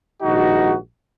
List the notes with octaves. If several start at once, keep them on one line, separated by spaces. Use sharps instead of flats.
A#1 G#2 D#3 D#4 F#4